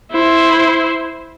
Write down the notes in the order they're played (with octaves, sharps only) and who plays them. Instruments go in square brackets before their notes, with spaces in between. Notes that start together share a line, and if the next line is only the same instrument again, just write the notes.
[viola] E4 C5